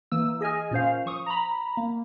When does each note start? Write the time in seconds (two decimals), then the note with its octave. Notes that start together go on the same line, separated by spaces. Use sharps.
0.12 E3 A#3 E6
0.41 G#4 D#5 G#5 F6
0.71 A#2 C#4 C5 F5
1.06 F3 C#6 D#6
1.26 A#5 B5
1.77 A#3